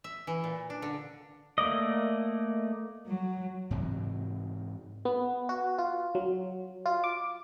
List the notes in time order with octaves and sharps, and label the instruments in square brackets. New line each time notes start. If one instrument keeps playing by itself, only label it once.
[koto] E5
E3
A#2
D4
D3
[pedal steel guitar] A3 A#3 D5 D#5
[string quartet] F#3
[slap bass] G#2 C3 E3 F#3
[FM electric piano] B3
F#4
F4
F#3
F4
D6